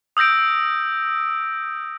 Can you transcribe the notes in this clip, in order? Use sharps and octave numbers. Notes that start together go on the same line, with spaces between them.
D#6 E6 G6 A#6 D7